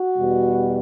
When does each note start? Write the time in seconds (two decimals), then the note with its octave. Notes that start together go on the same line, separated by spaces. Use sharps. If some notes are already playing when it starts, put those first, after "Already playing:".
Already playing: F#4
0.17 E2 B2 G3